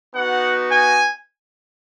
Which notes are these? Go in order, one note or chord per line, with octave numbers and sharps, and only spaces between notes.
B3 D#4 F#4 F#5
G#5